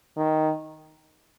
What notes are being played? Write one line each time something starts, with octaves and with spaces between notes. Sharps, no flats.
D#3